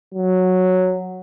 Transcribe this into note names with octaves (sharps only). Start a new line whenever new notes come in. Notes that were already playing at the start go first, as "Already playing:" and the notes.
F#3